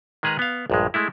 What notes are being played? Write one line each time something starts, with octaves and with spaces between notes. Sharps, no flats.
D#3 G#3 G#4 B4 A#5
B3 F5
A#1 G2 G#3
G#3 A3 E4